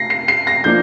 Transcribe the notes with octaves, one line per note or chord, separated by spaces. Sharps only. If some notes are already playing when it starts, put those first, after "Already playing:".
Already playing: A#6 C7
C7
C7
A#6
F3 A#3 D4 G6